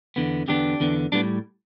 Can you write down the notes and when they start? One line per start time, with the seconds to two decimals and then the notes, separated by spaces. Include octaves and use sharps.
0.16 E2 D3 B3
0.48 E2 D3 B3 D4 G4
0.80 E2 D3 B3
1.12 A2 G3 B3 D4